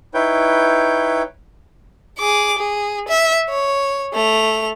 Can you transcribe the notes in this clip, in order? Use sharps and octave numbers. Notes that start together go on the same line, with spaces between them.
D#4 E4 B4 C#5 G5 G6
G#4 D6
G#4
E5
C#5
A3 F7